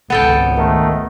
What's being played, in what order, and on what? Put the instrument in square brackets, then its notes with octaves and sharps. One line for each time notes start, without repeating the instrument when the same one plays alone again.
[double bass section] G#1 C#2 [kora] B3 A4 G5
[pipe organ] D#3 A3